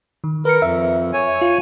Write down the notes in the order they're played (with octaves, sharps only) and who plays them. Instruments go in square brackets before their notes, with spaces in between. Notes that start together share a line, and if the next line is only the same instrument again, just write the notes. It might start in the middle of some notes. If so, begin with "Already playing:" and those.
[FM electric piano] D#3
[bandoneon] A#4 [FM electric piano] B4 C#7
[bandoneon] F2 [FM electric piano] E5
[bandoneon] C#5 G#5
[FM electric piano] F4